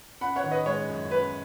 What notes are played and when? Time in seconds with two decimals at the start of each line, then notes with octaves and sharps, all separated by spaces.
0.21 C#4 F#5 B5
0.36 C#5 F#5
0.43 D#3
0.51 B4 D#5
0.66 G#3 C#5
0.89 F#2
1.11 C#4 B4